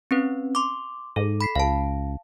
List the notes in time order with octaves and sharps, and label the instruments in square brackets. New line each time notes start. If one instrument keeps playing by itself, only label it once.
[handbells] C4 C#4 B4
C6 D6
[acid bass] G#2 [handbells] A4
[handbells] B5 B6 C7
[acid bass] C#2 [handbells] F5 A5